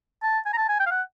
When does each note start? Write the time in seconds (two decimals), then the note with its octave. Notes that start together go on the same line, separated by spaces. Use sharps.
0.23 A5
0.46 G#5
0.53 A#5
0.57 A5
0.68 G#5
0.80 G5
0.86 F5
0.91 F#5